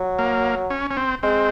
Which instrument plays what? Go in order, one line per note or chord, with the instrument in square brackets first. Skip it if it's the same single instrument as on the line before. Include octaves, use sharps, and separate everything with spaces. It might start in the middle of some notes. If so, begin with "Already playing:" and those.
Already playing: [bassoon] F#3
[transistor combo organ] A#3
C#4
C#4
C4
[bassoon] G#3 [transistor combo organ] C4